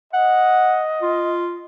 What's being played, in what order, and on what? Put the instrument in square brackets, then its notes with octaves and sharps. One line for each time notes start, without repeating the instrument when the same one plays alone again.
[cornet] D#5 [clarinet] F#5
[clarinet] F4